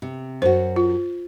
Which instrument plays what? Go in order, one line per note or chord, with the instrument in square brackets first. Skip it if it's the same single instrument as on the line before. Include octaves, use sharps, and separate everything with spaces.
[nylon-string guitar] C3
[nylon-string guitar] F#2 F#4 [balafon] C5
[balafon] F4